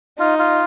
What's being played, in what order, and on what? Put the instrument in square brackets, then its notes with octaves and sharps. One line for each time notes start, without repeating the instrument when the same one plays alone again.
[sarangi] D#4 [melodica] F4
[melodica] F4